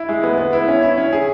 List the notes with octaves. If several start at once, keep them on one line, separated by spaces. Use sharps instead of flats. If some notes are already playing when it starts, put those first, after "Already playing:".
Already playing: E4
G#3
B3
B3
E4
C#4
E4
C#4
G#4